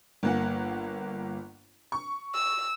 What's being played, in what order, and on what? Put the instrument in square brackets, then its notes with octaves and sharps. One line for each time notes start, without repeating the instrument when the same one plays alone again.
[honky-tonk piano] G1 A#3 F#5
C#6
[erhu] E6